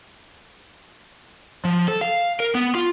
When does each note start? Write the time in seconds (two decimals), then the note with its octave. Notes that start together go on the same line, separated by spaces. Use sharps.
1.65 F3
1.88 A4
2.01 F5
2.40 A#4
2.55 B3
2.75 F4